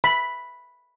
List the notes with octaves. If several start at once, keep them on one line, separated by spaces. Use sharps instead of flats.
B5